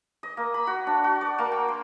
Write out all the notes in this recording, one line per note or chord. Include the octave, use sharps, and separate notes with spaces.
D#5
A#3
B5
F#4
D4
F#4
D5
A#3
G5
C6